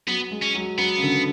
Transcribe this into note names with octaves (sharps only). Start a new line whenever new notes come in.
F#3 B3
G#3
C#4
F#3
F#3 B3
C#3
D3